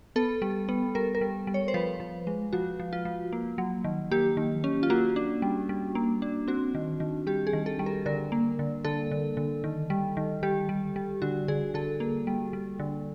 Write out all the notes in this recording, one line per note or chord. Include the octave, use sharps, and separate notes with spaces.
B3 A4
G3
B3
G3 A#4
A#4
G3
G3
C#5
C5
F3 B4
F3
G#3
F3 F#4
F3
F4
F3
A#3
F#3
D#3
A#3 G4
D#3
C#4
F4
A#3 F#4
D4
G3
G3
A#3
D4
C4 F#4
D#3
D#3
G3 G4
G#4
D#3
A4
G3
A#4
D3 A#4
A#3
D3
D3 A4
D3
D3
D#3
G3
D#3
G3 G4
G3
G3
D3 F#4
D3 G#4
D3 A4
A#3
G3
G3
D3